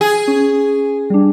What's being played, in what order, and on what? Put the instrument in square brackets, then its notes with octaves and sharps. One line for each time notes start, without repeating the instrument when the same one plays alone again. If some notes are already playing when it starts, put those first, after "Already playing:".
[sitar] G#4
[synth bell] C#4
G3 D4